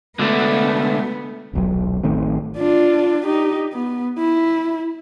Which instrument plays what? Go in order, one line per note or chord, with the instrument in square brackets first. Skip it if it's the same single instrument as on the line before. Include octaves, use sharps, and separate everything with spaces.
[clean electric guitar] D3 A3 [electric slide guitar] G#3 D4 F#4 [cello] B3
[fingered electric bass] D#1 B1 F#3
A1 D#3 A3 C4
[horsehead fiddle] D4 F4
D#4 G4
B3
E4